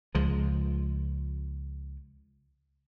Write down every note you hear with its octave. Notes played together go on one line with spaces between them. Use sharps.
C#2 F3 G#3